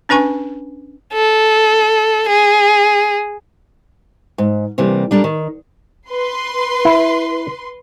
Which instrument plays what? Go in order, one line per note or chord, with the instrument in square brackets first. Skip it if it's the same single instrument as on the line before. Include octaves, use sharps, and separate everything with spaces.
[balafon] C#4 D4 B4 G#5 C#6
[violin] A4
G#4
[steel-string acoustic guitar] G#2
C3 E3 G3 A#3
G3 D4 A4 A#4
D#3
[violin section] B4 C6
[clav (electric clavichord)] E4